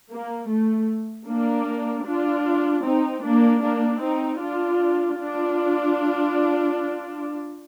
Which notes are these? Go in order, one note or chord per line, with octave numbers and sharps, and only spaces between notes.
A#3
A3
A#3 D4
D4 F4
C4 D#4
A#3 D4
A#3 D4
C4 D#4
D4 F4
D4 F4